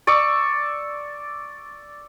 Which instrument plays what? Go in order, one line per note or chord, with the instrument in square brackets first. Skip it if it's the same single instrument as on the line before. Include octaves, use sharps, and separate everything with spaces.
[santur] D5 C#6 E6